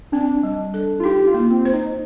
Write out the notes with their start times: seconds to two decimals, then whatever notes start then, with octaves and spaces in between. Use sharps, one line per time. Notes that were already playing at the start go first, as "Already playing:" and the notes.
0.12 C4 D4
0.43 G3
0.74 A4
1.00 F4
1.04 D#4 G4
1.27 F4
1.34 A#3
1.50 C4
1.65 C5
1.73 D#4